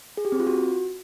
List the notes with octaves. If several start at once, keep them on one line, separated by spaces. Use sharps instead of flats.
G#4
G4
C4
F4
F#4